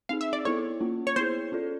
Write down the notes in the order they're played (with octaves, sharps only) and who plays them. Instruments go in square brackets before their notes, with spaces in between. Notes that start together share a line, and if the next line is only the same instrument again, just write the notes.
[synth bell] C4 D#4 G#4 [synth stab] F5
[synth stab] E5
D5
[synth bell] B3 E4 A4 C5 [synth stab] C#5
[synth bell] A#3 C#4 F4
[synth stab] C#5
[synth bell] B3 E4 G#4 [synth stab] C5
[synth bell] C#4 F4 A4 D5